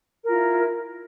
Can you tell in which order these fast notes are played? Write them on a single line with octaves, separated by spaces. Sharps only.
A#4 F4 E4